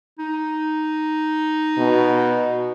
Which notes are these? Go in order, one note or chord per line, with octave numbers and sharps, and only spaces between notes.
D#4
B2